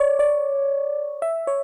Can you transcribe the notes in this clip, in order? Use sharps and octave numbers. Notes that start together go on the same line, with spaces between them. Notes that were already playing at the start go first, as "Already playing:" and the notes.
Already playing: C#5 D5
D5
E5
C#5